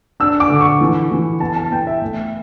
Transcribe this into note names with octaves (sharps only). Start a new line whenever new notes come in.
D4 E6
D6
D3
C#6
E3
E3
B3 A5
A5
B3 G5
E5
A3